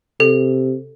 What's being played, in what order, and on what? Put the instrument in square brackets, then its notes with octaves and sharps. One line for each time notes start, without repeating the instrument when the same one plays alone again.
[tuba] C3 [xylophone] A4